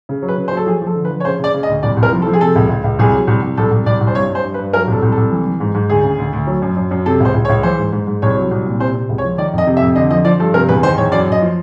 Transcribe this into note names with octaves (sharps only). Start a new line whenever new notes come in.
C#3
F#3
B4
C#3
C5
F#3 A4
F3 G#4
F3 A4
D3
B4
F3
C#5
C#3 C5
C#3 D5
C#3
D#5
D2
C2 D5
C2
A#4
F3
A4
F3
G#4
C3 A4
C#2
C#2
C#2
C2 G#4
F#3
C2
C2
C2 A4
C2
C2 D5
C2
C5
G2 C#5
G2 C5
G2
B4
G2
F#3 A#4
C2 A4
C2
A4
C2
E3
E3
G#2
G#2
D2 G#4
C#3
D2
D2
F#3
F#2
F#2
F#2
C3 A4
C#2 C5
C#2
C#5
C#2
E3 C5
G#2
G#2
G#2
C2 C#5
F#3
C2
A#2
C3 C5
C3
C#2
C#5
F3
D#3 D5
F2 D#5
C3
E5
F2
D3 D#5
F3 D#5
F3 D5
G2 A4
C3 A#4
E2 B4
D#3 C5
E2 C#5
F#2 D5
F#2 D#5
F3